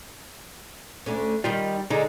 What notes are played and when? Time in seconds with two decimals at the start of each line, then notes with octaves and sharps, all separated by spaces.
1.06 D2 D3 C#4
1.44 D#3 G3 D#4 F4
1.90 D3 G#3 D#4